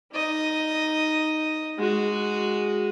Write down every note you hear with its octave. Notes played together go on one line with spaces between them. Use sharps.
D#4 D#5
G#3 F#4